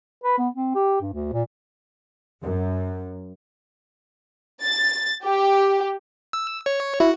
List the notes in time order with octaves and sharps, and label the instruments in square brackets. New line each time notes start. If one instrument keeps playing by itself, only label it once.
[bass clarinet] B4
B3
C4
G4
G2
D2
A#2
[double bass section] F#2
[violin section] A6
G4
[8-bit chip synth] E6
C#5
[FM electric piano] E4 [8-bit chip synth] F#4